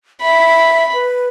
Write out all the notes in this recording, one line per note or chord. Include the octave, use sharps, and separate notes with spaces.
E5 B5
B4